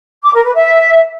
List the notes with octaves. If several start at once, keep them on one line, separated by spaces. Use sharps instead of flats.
D6
A#4
B4
E5